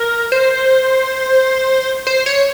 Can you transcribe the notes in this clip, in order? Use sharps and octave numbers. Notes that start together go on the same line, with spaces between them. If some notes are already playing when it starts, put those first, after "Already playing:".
Already playing: A#4
C5
C5
C#5